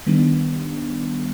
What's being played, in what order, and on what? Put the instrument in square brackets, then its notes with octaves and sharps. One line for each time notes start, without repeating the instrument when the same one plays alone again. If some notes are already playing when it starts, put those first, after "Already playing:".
[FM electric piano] D#3 G3 B3 D4